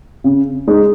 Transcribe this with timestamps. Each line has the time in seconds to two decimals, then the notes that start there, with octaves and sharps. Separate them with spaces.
0.24 C#3
0.68 G#3 D#4